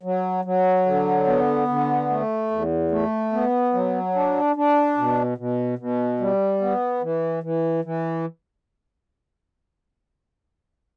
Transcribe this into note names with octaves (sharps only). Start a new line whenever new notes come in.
F#3
F#3
D3
B3
D3
A3
E2
A3
B3
F#3
D4
D4
B2
B2
B2
G3
B3
E3
E3
E3